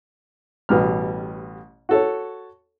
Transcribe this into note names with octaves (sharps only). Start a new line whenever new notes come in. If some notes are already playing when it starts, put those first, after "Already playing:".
A1 B2 G3 F6
F#4 A4 C#5